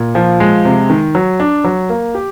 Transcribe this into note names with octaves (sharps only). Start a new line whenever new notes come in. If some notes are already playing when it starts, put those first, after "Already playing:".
Already playing: A#2
F3
G#3
C3
D#3
F#3
D4
F#3
A#3
G4